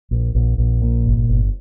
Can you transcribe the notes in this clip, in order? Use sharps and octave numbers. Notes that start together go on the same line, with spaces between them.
A#1
A#1
A#1
A#2
G1
G1